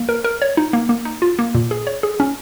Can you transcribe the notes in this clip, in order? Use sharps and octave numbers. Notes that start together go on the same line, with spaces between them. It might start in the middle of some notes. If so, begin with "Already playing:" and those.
Already playing: A#3
A#4
A#4
C#5
D#4
A#3
A#3
D#4
F4
A#3
A#2
G#4
C#5
G#4
C#4